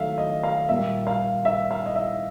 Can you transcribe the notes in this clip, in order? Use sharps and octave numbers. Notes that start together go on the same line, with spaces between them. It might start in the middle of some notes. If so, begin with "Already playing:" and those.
Already playing: D#3 F#3 A3 E5 F5
D#5
F5
A#2 G3 A#3 E5
F5
E5
F5
D#5
E5